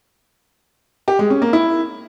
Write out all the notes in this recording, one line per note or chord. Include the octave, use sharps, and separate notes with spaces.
G4
G#3
C#4
A#3
E4